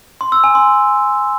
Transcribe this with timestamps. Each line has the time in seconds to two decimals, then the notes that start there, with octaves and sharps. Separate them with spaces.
0.21 C6
0.32 E6
0.44 G#5
0.55 C6